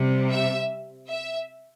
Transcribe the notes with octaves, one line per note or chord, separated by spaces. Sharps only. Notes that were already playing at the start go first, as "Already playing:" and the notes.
Already playing: C3 G3
E5
E5